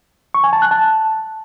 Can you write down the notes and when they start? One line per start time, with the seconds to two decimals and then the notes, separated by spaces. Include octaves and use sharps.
0.34 C#6
0.44 G#5
0.53 A5
0.62 F#6
0.71 A5